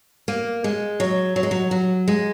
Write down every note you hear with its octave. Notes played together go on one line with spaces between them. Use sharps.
A#3
G#3
F#3
F#3
G#3
F#3
F#3
G#3